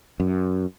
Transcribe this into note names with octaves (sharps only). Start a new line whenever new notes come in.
F#2